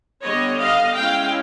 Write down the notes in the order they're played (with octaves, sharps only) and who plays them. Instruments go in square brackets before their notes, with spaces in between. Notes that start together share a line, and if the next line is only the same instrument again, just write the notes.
[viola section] D3 G3 B3 C#5 D#5
D#5 F5
G#3 C#4 E4 F5 G5